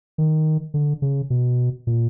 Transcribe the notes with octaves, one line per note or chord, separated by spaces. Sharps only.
D#3
D3
C#3
B2
A#2